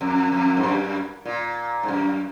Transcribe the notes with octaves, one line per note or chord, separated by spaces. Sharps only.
F2
F2
G#2
F#2
A#2
G#2
F#2